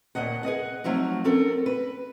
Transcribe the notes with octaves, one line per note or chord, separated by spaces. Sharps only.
D#2 A#2 D#3 D#5 F#5
G#4 B4 D#5 F#5
F3 F#3 A3 C4 D#4
C4 C#4 A4 A#4
B4